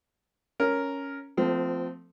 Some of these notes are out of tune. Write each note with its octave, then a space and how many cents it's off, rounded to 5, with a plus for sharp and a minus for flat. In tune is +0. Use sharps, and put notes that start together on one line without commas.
C#4 +0 A#4 +0
F3 +5 A3 +15 C4 -25